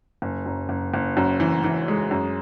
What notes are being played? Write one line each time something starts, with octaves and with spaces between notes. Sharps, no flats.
F#1
F#2
F#1
F#1
F#2
E3
E3
G#3
F#2